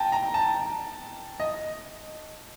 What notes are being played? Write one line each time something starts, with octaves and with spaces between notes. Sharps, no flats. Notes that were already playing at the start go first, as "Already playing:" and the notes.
Already playing: G5 A5 A#5
A#5
A5
D#5